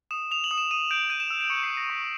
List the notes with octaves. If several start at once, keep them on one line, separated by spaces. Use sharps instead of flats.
D#6 E7
D#6 F7
F#7
D#6
E7
D#6 D#7
G6 D7
G6 D#7
E7
E6
D7
C#6 C#7
C7
G6
A#6
C#6 B6